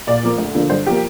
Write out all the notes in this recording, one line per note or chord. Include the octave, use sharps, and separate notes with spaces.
A#2 D5
F3 A#3
D2
D3 F3 A#3
G2 C5
F3 A#3 G4